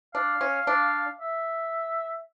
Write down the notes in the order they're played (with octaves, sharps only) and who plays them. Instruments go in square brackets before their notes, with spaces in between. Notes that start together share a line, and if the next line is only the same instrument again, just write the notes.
[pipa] D4 [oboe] F5
[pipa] C#4
D4
[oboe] E5